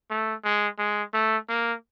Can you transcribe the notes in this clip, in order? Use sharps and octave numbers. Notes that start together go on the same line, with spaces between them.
A3
G#3
G#3
A3
A#3